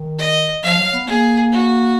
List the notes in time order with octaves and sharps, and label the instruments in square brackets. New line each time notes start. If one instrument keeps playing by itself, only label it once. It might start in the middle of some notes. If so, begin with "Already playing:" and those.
Already playing: [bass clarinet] D#3
[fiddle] D#5
[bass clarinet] F3 [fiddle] F5
[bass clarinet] F#3
B3
[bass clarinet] A#3 [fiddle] G#4
[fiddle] F#4